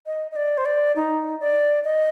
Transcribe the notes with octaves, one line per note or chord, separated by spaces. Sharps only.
D#5
D#5
D5
C5
D5
D#4
D5
D#5